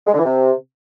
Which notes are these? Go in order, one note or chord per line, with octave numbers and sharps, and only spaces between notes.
G#3
D3
E3
C3